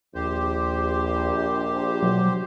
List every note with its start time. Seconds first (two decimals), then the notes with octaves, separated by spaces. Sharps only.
0.15 A#1 D#2 G4 C5
2.02 B2 F#3